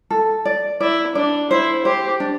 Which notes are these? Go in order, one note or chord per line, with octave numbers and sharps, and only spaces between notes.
A4
D5
E4 D5
D4 D5
E4 C5
G4 C5
D4